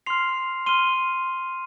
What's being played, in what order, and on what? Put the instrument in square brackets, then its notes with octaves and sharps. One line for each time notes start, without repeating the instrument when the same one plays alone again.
[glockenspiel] C6 F6 C7 F7
C6 F6 D#7 G7